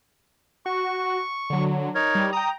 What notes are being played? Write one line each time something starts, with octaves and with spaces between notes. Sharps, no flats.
F#4 C#6
D3 F#3
D#4 A#4 C#5
G3
G5 A#5 D#6